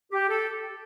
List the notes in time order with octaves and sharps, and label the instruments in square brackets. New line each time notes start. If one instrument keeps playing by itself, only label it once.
[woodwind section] G4
A4